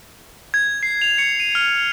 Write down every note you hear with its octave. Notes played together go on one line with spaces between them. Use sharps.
G#6
C7
F7
C#7
D#7
F6
F7